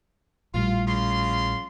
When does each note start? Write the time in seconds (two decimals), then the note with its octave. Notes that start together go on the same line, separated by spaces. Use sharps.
0.54 A#1 A2 G3 F4
0.87 C#3 F4 C6